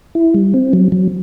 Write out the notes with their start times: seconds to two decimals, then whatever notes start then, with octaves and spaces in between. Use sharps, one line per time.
0.15 E4
0.34 G3
0.54 C4
0.73 F#3
0.92 F#3